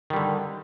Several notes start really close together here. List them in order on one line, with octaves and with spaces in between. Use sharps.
D#3 G3 D3